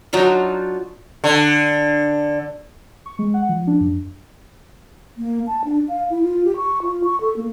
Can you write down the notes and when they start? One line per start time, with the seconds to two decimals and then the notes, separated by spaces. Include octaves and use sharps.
0.13 F#3 D4 D#4 F4
1.24 D3
3.06 C#6
3.19 G#3
3.34 F#5
3.49 F3
3.67 D4
3.81 F#2
5.18 A#3
5.47 A5
5.65 D4
5.89 F5
6.10 E4
6.23 F4
6.45 G4
6.57 C#6
6.82 F4
7.04 C#6
7.21 A4
7.37 A#3